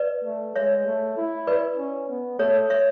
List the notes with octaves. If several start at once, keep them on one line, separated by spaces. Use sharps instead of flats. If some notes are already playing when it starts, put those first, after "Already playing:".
Already playing: B4 D5
A3
G#3 C#5 E5
A3
E4
B4 D5
C#4
B3
A3 A4 C#5
C#5 E5